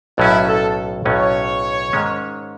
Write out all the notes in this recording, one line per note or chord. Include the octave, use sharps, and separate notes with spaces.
B1 A2 F#3 C#4 E4
A4
B1 A2 F#3 C#4 C#5
G#2 D#3 G#3 C#4